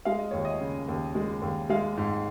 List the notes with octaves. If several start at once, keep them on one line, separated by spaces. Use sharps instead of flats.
G#3 F5
D#5
D#2 C#5
D#5
C#3
D#2
G#3
D#2
G#3 F5
G#2